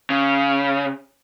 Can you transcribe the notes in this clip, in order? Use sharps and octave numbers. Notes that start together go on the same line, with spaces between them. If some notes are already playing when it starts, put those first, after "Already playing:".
C#3